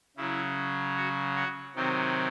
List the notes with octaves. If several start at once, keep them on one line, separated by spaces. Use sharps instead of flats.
C#3 F#3 E4
F#4
F#4
C3 D#3 F#3 C4